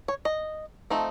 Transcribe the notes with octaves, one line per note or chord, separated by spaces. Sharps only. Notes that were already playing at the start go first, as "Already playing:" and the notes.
C#5
D#5
F3 A3 C4 D#4